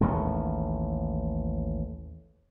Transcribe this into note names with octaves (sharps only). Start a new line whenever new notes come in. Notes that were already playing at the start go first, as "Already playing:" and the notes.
A1 D#2 A2 G#3